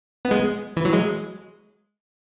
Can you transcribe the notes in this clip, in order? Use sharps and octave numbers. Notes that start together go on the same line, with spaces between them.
B3
G#3
E3
F#3
G#3